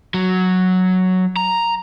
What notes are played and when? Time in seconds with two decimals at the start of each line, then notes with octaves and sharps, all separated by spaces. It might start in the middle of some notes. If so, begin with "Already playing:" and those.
0.14 F#3
1.36 A#5